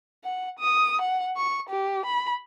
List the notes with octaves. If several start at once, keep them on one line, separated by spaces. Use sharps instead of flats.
F#5
D#6
F#5
C#6
G4
B5